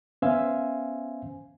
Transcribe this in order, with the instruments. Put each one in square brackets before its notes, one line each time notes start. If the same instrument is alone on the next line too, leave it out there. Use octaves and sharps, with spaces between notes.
[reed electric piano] B3 C#4 C5 E5 F5 G#5